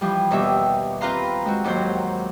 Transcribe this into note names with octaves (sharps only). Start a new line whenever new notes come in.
E3 F3 G3
D#2 B2 G3 E5
C4 F4 B4 F5 A#5 C6
G#3 C4 F#4
D#2 G#2 F#3 C5